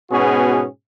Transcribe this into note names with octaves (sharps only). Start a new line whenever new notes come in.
G#2 B2 B3 C#4 F#4 G#4